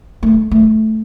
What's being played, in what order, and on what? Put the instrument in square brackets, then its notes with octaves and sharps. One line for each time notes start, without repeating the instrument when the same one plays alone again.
[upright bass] A3
A3